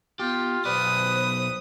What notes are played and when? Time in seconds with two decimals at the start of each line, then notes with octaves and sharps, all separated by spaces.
0.20 B3 F4 G4
0.65 B1 B4 C5 D5 D#6